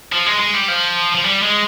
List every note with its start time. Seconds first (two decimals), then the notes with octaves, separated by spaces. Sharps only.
0.12 F3
0.26 G#3
0.39 G#3
0.54 G3
0.68 F3
1.15 F3
1.24 G3
1.43 G#3